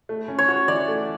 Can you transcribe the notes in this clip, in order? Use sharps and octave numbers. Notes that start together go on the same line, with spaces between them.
A3
C#4
C#5
F#4
E3 D5
A3